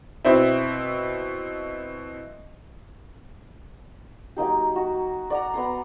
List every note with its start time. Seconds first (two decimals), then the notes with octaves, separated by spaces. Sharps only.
0.25 B2 C4 E4
4.36 F#3 A#3 D#4 G4
4.76 F#4
5.30 D5 F#5 A#5
5.54 B3 A#5 C6